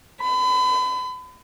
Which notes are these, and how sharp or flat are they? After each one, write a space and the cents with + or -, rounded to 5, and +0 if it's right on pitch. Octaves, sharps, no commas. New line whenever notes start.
B5 +35